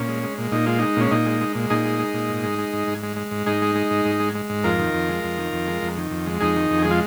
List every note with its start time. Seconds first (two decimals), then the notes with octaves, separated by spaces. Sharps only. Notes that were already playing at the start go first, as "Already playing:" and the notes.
Already playing: A#2 C#4
0.09 G#3
0.23 G#3
0.38 A#2
0.52 A#2 D#4
0.66 G#3 F4
0.79 G#3 D#4
0.96 A#2 C#4
1.11 A#2 D#4
1.26 G#3
1.41 G#3
1.55 A#2
1.70 A#2 D#4 G#4
1.85 G#3
1.99 G#3
2.14 A#2
2.29 G#2
2.44 G#3
2.59 G#3
2.73 G#2
2.87 G#2
3.03 G#3
3.17 G#3
3.31 G#2
3.46 G#2 D#4 G#4
3.62 G#3
3.75 G#3
3.91 G#2
4.05 G#2
4.20 G#3
4.35 G#3
4.50 G#2
4.64 F2 F4 A#4
4.79 D#3
4.94 F2
5.09 G#3
5.24 F2
5.37 D#3
5.53 F2
5.68 G#3
5.82 F2
5.97 D#3
6.11 F2
6.26 G#3
6.41 F2 D#4 G#4
6.56 D#3
6.71 F2
6.83 G#3 G#4
6.91 F4